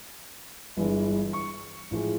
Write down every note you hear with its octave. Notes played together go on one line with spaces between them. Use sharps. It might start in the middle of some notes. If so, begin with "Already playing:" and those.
G1 G2 E3 G#3
C#6
A1 A2 F3 G#3